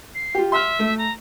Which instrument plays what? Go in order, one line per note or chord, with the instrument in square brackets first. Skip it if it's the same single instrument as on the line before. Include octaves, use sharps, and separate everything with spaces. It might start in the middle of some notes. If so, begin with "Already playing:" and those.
[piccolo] C7
[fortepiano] F4 G4
[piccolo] E5 [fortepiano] C6 F6
[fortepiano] A3
[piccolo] A#5